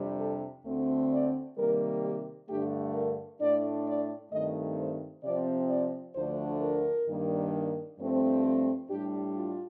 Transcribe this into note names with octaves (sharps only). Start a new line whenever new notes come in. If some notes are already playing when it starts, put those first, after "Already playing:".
Already playing: F2 C3 G3 D4
A4
D2 D3 A3 C4
D5
C3 D#3 G3 A#3 A#4
G4
G2 D3 A3 D4 G4
A#4
A2 A3 D4 D5
D5
G2 D#3 A3 C4 D#5
C5
C3 F3 C4 D5
D5
D2 D3 F3 A3 D4 C5
A#4
G2 D#3 G3 A#3 D4
G2 F3 A3 C4
A4
A2 G3 D4 G4
F4